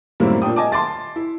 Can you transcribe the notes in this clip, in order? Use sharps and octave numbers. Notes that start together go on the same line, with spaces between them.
F#2 A2 G3 A#3 C4 E4
A#2 D4 G5 D#6
D#5 G#5 A5 D6
A5 C6 D6 A6
E4